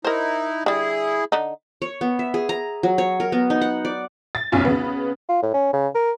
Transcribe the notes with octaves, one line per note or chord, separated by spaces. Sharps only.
D#4 E4 A#4 C5
D3 G3 E4 G#4
D3 D#4
C#5
B3
E5
G#4
A#5
F#3
C#5
A#4
B3
D#4
F#5
D5
A6
F1 B1 C#4 F4
C#3 B3
F4
A2
C#4
C#3
A#4